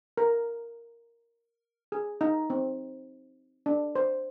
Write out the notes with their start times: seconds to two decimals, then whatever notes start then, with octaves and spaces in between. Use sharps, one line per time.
0.17 A#4
1.92 G#4
2.21 D#4
2.50 C4
3.66 D4
3.95 C5